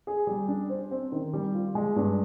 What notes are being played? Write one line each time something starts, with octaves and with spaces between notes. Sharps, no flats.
G#4
G3
D4
C5
C4
D#3
G3
F4
G#3
G2